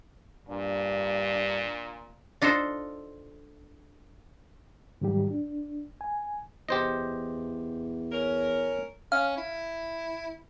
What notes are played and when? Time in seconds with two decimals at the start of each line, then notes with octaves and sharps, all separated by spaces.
0.48 G2 A#2 D4
2.42 D4 D#4 F4 A4 C5
5.01 G#2 D#3 F#3 G3 G4
5.30 D4
6.01 G#5
6.69 E2 G4 C5 D#5
8.12 C#4 A#4 C#5
9.12 C#4 F5
9.37 E4